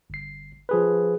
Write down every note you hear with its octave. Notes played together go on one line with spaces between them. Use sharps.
G1 C7
F3 G#4 B4